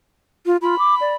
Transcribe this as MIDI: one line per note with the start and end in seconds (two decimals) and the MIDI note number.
0.46 0.57 65
0.62 0.78 65
0.62 1.16 83
0.79 0.95 86
1.01 1.14 74